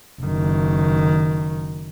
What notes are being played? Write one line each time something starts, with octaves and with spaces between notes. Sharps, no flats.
F#1 D#3